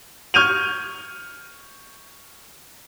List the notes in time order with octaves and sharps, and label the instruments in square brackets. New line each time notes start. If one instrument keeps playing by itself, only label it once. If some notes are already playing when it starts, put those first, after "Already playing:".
[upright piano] C#6 F6 G6 G#6 D#7 F7